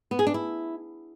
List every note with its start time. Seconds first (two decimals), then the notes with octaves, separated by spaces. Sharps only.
0.11 B3
0.19 G#4
0.27 D4
0.34 E4